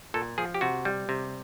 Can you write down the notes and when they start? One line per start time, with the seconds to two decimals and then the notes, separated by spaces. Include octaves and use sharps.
0.14 A#2 A4
0.38 F3 G#4
0.54 G4
0.61 C3 F#4
0.85 G3
1.09 C3